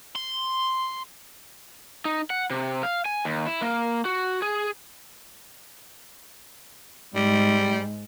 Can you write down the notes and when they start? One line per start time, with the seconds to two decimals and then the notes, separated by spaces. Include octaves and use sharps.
0.16 C6
2.05 D#4
2.30 F#5
2.50 C3
2.83 F5
3.06 G#5
3.25 D#2
3.47 E4
3.62 A#3
4.05 F#4
4.42 G#4
7.15 G#2 G3